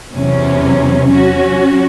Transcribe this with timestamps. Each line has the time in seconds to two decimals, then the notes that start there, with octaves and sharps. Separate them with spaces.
0.13 E2 C3 F#3 C#4
1.10 F#3 C#4 F#4